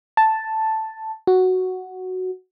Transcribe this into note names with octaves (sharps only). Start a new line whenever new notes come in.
A5
F#4